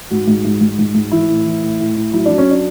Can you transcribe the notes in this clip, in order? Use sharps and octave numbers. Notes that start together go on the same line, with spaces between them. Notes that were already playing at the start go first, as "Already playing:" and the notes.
G#2 F#4
G#2
G#2
G#2
G#2
G#2
E3 E4
A2
E3
A2
A2
A2
F#3 E4
D4
F#3
C#4
D4